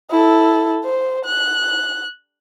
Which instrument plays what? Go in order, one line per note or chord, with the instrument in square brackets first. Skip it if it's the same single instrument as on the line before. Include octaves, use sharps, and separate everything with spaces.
[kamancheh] E4 A4
C5
F#6